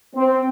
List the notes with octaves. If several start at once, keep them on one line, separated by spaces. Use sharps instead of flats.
C4